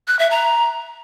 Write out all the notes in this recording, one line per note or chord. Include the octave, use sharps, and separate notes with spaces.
F#6
E5
A#5